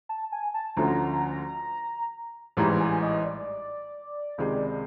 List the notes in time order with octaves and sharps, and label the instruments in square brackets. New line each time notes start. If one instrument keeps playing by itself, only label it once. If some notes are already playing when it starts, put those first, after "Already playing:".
[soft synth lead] A5
G#5
A5
[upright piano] D2 D3 F3 A3 C#4 [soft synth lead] A#5
[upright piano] A1 G#2 E3 G3 [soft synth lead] A#5
[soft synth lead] G#5
D#5
D5
[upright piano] C#2 C3 D#3 G#3